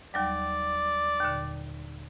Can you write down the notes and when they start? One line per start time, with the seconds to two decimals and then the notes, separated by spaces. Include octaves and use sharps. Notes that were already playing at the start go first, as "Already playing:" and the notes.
0.14 D#2 F#3 G3 D5
1.21 D#2 A#2 D3